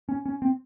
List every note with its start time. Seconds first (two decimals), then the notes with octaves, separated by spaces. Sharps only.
0.09 C#4
0.26 C#4
0.42 C4